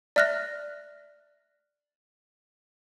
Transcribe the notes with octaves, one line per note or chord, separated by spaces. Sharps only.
D5 E5 F6 F#6 A#6